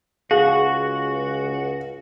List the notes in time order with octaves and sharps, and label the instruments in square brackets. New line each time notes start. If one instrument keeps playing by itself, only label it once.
[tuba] C#2 [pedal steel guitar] F#4 [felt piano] G#4 [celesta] F5